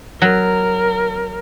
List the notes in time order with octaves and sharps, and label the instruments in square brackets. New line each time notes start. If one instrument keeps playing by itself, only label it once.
[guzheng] F#3 [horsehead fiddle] A#4